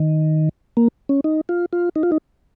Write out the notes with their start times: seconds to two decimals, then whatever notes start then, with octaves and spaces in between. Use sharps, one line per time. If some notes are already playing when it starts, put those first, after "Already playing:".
Already playing: D#3
0.77 A#3
1.09 C#4
1.24 D#4
1.49 F4
1.73 F4
1.96 D#4
2.03 F4
2.12 D#4